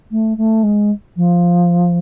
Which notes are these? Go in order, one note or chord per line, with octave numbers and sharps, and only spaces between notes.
A3
A3
G#3
F3